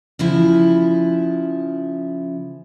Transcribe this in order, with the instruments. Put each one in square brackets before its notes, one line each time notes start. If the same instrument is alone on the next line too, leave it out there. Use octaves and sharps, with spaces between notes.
[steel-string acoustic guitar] C#3 F3 E4